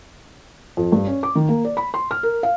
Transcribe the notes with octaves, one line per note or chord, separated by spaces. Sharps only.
F2
G2
C#4
D6
D#3
A#3
D5
B5
C6
F6
A#4
F5